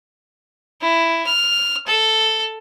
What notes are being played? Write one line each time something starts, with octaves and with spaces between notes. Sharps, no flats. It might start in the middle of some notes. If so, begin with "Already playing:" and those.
E4
F6
A4